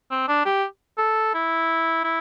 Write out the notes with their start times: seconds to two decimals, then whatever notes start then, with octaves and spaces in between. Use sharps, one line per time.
0.11 C4
0.28 D4
0.46 G4
0.98 A4
1.34 E4
2.04 E4